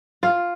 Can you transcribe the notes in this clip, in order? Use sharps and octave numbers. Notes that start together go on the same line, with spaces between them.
F4